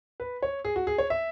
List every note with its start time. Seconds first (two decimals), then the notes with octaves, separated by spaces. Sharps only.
0.20 B4
0.42 C#5
0.64 G#4
0.76 F#4
0.87 G#4
0.98 C#5
1.10 E5